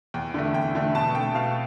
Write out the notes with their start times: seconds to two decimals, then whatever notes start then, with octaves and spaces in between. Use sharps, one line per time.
0.14 E2 G5
0.34 D3 A3
0.54 E2 G5
0.75 D3 A3
0.95 B2 A5
1.15 A3 G5
1.35 B2 F5